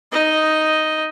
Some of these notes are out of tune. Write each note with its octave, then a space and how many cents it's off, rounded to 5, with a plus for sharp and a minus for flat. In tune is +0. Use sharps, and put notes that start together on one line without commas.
D#4 +0 D#5 +0